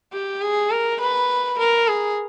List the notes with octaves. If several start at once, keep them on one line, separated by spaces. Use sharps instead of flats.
G4
G#4
A#4
B4
A#4
G#4